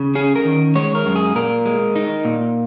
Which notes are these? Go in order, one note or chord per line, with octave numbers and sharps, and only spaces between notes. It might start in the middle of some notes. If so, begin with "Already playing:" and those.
Already playing: C#3
C#4 G#4
A#4
D#3
G#3 C#5
A#4
F#2
G#4
A#2 A#4
G#3
D#4
A#2